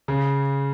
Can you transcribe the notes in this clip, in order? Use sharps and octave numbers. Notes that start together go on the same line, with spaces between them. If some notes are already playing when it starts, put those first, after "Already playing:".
C#3